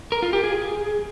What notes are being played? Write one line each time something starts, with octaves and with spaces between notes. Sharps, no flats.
A#4
F4
G4
G#4